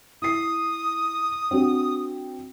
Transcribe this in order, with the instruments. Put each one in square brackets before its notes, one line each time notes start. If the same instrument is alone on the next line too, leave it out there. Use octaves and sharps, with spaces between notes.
[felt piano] E4 C7 [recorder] D#6
[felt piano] C4 D4 F#4